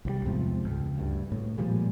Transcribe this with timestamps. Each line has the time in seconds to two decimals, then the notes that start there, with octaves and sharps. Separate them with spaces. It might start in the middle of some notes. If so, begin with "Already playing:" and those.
0.05 C2 E3 G3
0.25 E2 G#2 C3 F3
0.65 C#2
0.98 D2 G2
1.32 A2
1.58 A#2 F3 G3 G#3